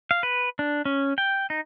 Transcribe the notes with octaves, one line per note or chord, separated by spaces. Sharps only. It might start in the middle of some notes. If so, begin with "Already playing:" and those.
F5
B4
D4
C#4
G5
D#4